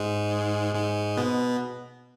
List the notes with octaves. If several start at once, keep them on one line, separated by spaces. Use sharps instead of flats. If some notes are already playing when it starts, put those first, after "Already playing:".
Already playing: G#2 G#3
G#2 G#3
B2 B3